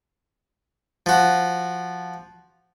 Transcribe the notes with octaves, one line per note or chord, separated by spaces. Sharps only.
F3 F#4